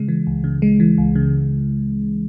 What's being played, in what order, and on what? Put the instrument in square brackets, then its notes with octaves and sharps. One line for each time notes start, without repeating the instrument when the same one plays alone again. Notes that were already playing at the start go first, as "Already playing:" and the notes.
Already playing: [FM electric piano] C#3 G#3
E3
C#2
C#3
G#3
E3
C#2
C#3